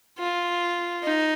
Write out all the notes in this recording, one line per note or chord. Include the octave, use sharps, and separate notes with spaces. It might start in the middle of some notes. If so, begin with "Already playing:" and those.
F4
D#4